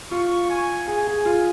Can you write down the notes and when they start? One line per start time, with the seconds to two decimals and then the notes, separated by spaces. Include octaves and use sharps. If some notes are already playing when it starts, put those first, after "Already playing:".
0.11 F4 C#6
0.50 G#5
0.87 G#4 G#5
1.07 G#4
1.25 F4